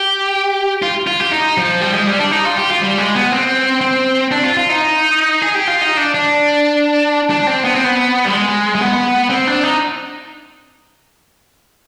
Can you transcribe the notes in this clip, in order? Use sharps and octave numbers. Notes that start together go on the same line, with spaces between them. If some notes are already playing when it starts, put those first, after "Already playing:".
Already playing: G4
F4
F4
G4
D#4
F3
G3
G#3
G3
D4
D#4
F4
G4
F4
G3
G#3
B3
C4
C4
D4
F4
F4
D#4
G#4
G4
F4
D#4
D4
D4
D4
C4
B3
C4
B3
G3
G#3
G#3
B3
C4
D4
D#4